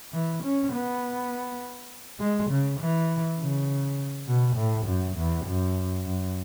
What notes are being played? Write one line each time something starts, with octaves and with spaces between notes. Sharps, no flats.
E3
C#4
B3
G#3
C#3
E3
C#3
B2
A2
F#2
E2
F#2
F#2